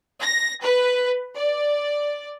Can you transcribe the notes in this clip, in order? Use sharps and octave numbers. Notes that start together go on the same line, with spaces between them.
A#6
B4
D5